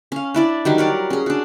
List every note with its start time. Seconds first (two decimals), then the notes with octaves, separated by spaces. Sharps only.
0.12 C#4 F5
0.34 D4 E4 D5
0.65 D#3 F#3 G3 D4
0.78 A#4 C#5 D5
1.10 C#4 G#4
1.26 D4 F#4